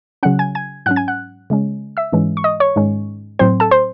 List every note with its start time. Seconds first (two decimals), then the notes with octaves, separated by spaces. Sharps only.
0.23 C#3 F#3 C#4 F#5 F#6
0.39 G#5 G#6
0.55 G#5 G#6
0.86 G#2 F#3 C#4 F#5 F#6
0.96 G#5 G#6
1.08 F#5 F#6
1.50 C#3 G#3 C#4
1.97 E5 E6
2.12 G#2 E3 G#3 C#4
2.37 C#6
2.44 D#5 D#6
2.60 C#5 C#6
2.76 G#2 D#3 G#3 C#4
3.39 A2 F#3 C4 C5 C6
3.60 A4 A5
3.71 C5 C6